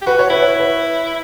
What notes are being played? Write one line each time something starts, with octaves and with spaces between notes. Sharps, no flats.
G4
F#4 B4
F#4 C#5
E4 B4
C#5
B4